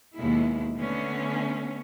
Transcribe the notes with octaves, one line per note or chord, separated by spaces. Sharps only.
D#2 B2 G#3 E4
D3 A3 B3 C#4